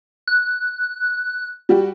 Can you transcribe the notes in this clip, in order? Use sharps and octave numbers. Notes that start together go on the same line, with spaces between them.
F#6
G3 F#4 G4